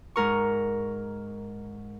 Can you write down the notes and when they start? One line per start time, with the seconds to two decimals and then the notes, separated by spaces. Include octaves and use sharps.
0.16 G#2 A#4 C#6